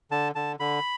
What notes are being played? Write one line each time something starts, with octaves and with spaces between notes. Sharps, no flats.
D3 A5
D3 A5
D3 B5